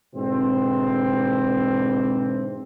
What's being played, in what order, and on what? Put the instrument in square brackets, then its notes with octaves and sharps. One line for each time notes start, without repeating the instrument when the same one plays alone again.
[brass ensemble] G#2 B2 D3 E3 C4